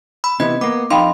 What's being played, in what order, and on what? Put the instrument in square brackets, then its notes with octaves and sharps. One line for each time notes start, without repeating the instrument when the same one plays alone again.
[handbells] B5 E6
[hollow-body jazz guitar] C3 E3 B3 [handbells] D#5 G#6
[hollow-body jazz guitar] A#3 B3 [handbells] D6
[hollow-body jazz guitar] F2 D#4 [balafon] F5 G5 B5 [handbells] C6